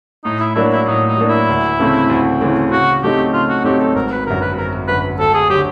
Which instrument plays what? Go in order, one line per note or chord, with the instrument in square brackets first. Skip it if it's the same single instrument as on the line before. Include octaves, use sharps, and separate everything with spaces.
[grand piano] A2 [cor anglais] D#4
[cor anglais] E4
[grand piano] F#3 A#3 D4 [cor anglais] E4
[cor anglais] E4
[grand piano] A2 [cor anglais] D#4
[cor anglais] D#4
[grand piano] F#3 A#3 D4
[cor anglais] E4
[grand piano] D2
C#3 E3 A3 C4
D2
C#3 E3 A3 C4
[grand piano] C#3 [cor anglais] F#4
[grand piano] F#3 A3 C4 D#4 [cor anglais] G4
[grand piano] C#3 [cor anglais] F4
[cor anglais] F#4
[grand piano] F#3 A3 C4 D#4 [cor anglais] G4
[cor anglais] A4
[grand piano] G#1 [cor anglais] A#4
[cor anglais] B4
[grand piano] F#2 D3 [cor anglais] A#4
[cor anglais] B4
[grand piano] G#1 [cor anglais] A#4
[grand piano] F#2 D3 [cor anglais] B4
[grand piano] D2 [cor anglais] A4
[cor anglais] G#4
[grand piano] D3 F#3 [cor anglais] G4